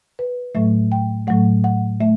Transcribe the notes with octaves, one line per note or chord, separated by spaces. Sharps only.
B4
A2 F#3 A3 E5
G5
A2 F#3 A3 F#5
F#5
A3 E5